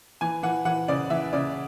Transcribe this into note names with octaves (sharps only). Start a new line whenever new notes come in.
E3 G#5
E3 F#5
E3 F#5
C#3 D5
E3 E5
C#3 D5